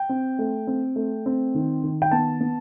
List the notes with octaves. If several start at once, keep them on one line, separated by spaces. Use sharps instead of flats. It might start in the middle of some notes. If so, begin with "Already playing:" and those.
Already playing: G5
C4
A3
C4
A3
C4
D#3
D#3
G5
B3 A5
B3